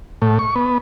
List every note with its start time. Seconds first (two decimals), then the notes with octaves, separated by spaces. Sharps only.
0.22 A2
0.39 C#6
0.56 B3